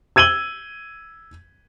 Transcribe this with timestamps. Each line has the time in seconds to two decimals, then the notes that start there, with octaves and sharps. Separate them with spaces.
0.16 E6 G#6 D#7 F#7 G7